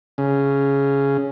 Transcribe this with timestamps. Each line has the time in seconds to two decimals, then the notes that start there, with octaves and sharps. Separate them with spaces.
0.18 C#3